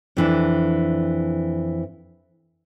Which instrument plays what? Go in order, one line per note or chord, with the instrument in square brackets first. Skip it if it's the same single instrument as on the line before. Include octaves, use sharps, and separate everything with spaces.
[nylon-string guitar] F2 E3 D4